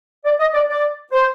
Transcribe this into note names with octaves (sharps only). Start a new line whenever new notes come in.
D5
D#5
D5
D5
C5